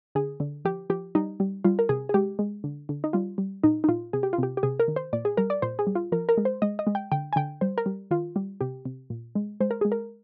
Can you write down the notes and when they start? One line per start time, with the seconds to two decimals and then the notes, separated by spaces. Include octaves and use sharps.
0.15 D3 G#4
0.40 D3
0.65 F3 G4
0.90 F3 G4
1.15 G3 D#4
1.40 G3
1.64 G3 F4
1.79 A#4
1.89 C3 G#4
2.09 G#4
2.14 G#3 G4
2.39 G#3
2.64 D3
2.89 D3
3.04 D#4
3.13 G3 F4
3.38 G3
3.64 A#2 D#4
3.84 D#4
3.88 A#2 F4
4.13 C3 G#4
4.23 G4
4.33 F4
4.38 C3 G4
4.57 G4
4.63 C3 G#4
4.80 A#4
4.88 D#3
4.96 C5
5.13 A#2 D5
5.25 G#4
5.37 G3 A#4
5.50 D5
5.62 A#2 C5
5.79 G#4
5.87 G3
5.95 F4
6.12 F3 A#4
6.29 A#4
6.37 G#3
6.45 C5
6.62 G#3 D#5
6.79 D#5
6.87 G#3
6.95 G5
7.12 D3 G5
7.33 G#5
7.36 D3 G5
7.61 G3 C5
7.78 A#4
7.86 G3
8.11 D#3 F4
8.36 G3
8.61 C3 G4
8.85 C3
9.10 A#2
9.35 G#3
9.60 G#3 C5
9.71 A#4
9.81 G#3 G#4
9.92 A#4